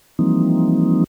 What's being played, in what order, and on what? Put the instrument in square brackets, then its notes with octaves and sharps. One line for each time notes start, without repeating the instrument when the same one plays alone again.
[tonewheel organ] E3 F3 G3 A#3 C4 D#4